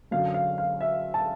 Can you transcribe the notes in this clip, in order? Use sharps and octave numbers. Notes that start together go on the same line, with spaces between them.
F#2 D3 F#3 F5
F5
F5
E5
A5